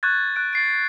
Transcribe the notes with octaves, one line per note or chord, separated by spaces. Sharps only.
C#6 F#6 G#6 A6
F#6 D7
A6 C7 D7